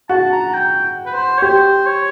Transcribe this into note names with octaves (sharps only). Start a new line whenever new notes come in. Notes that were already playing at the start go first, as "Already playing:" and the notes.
F#4 A5
A#5
G5
B4
C5
C#5
G4 C5
C#5